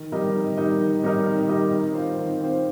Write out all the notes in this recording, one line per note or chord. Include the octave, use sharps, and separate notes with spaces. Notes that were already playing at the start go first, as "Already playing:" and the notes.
Already playing: D#3
G3 D#4 A#4 D#5
D#3
G3 D#4 A#4 D#5
D#3
G3 D#4 A#4 D#5
D#3
G3 D#4 A#4 D#5
D#3
C4 F4 C5
D#3
C4 F4 C5